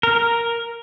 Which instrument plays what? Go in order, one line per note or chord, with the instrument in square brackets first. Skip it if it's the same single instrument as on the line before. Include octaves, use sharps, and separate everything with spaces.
[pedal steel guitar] A#4